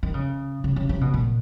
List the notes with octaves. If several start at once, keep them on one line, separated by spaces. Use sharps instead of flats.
D#3
C#3
C#3
C#3
C#3
B2
A#2